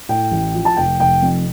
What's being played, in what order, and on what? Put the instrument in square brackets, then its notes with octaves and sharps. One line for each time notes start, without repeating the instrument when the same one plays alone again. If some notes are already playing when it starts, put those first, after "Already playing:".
[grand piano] A2 G5
A1
F3
A5
F1 G5
F1 G5
F2